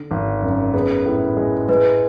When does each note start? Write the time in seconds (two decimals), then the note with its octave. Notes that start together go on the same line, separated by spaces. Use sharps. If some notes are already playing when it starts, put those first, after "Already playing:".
Already playing: D3
0.11 G#1
0.42 F#2
0.74 B3 G#4
1.05 A2
1.37 G#3
1.69 G#3 B4